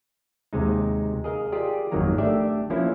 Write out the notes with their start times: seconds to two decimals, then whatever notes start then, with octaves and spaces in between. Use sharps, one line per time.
0.53 D#2 C3 G#3 D#4
1.24 G#4 A#4 D#5 F5
1.52 F4 G4 G#4 D5
1.91 G#1 F2 D#3 F#3 A#3 A#5
2.18 A3 D4 G4 D5 E5
2.70 F3 A#3 C#4 E4